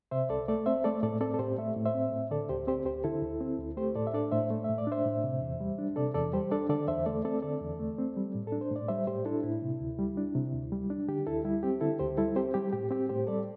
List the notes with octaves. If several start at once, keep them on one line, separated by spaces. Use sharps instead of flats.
C3 C5 E5
C2 A4 D5
A3 A4 D5
C4 C5 E5
A3 A4 D5
A2 A4 D5
C4 A4 D5
A4
A2 G4 C5
A3 E5
A2
C5 E5
C4
A2
D3 A4 D5
D2 G4 C5
C4 G4 C5
D2 G4 C5
D3 E4 A4
D2
C4
D2
A3 G4 C5
A2 A4 D5
E5
D4 A4 D5
A2 C5 E5
A3
A2 E5
D5
D4 C5 E5
A2
C3
E2
G3
D4
C3 A4 D5
E2 A4 D5
G3 G4 C5
D4 A4 D5
D3 A4 D5
E2 C5 E5
A3 A4 D5
C4 A4 D5
D3 A4 D5
E2
A3
C4
G3
A2
D4 A4
C5
A2 D5
G3 C5 E5
A2 G4 C5
D4 E4 A4
A2 E4
C3
D2
G3
D4
C3
D2
G3
D4
D3 G4
D2 E4 A4
G3 E4
C4 G4
D3 E4 A4
D2 G4 C5
G3 E4 A4
C4 G4 C5
G3 G4
A2 G4
C4 G4
A2 G4 C5
G3 A4 D5